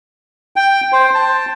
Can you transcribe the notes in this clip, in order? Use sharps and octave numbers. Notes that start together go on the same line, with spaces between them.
G5
C5
A5